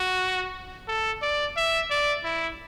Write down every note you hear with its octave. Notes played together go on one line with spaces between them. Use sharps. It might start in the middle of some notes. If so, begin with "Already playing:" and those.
Already playing: F#4
A4
D5
E5
D5
E4